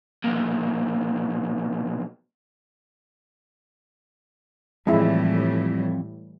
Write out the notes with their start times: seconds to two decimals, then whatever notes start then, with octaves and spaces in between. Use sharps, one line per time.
0.24 B1 A#2
4.87 F2 A2 E3 G3 G#3 E4